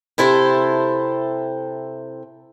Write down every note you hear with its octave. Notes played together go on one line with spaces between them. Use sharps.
C3 E4 A4 C5